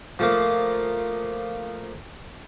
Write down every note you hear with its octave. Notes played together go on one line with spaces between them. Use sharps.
F3 A3 A#3